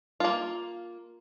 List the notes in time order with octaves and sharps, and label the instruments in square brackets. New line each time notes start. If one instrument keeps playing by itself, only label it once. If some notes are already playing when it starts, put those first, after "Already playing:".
[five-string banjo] A#3 F4